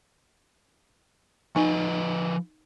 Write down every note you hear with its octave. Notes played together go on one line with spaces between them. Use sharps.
F3 D#4 B4 D#5 G#5